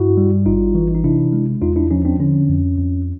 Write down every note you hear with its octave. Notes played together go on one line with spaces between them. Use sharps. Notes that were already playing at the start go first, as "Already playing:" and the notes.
Already playing: G2 E4 F#4
G3
G#1 D#4 F4
E3
D#4
C3 D4 E4
G#3
E2 D#4 F4
D4 E4
F3 C#4 D#4
C4 D4
D3 C#4
F2
F2